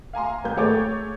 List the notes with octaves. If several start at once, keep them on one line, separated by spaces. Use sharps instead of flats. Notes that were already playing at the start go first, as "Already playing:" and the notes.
F5 G#5 A#5 C6
G#1 A#3 B4 G6
A3 G#4 C#5 D6 A6